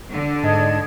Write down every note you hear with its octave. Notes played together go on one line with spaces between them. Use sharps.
D3
G#2 D#5 A5 G#6